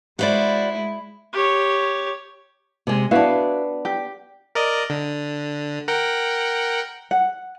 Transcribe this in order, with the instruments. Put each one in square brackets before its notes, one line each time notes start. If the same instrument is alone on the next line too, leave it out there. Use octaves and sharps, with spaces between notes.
[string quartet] G#3 E4 [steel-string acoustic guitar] F#4 C5 D5
[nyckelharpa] G4 C#5
[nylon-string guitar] C3 G#3
[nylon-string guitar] B3 D4 [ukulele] E4 F#4 F5
[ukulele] G4
[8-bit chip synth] A#4 D5 D#5
D3
A#4 F#5 G5
[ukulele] F#5